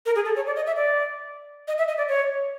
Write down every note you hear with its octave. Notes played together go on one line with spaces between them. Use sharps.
A#4
G#4
A4
C#5
D5
D#5
E5
D5
D#5
E5
D#5
D5
C#5